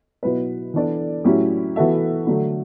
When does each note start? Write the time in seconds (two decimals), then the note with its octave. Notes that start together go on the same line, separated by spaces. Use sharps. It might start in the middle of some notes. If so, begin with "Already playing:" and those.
0.23 B2 F#3 B3 E4 B4
0.74 E3 B3 D4 A4 D5
1.24 A2 F#3 C#4 E4 G4
1.76 E3 B3 F#4 A4 E5
2.27 D3 F#3 A3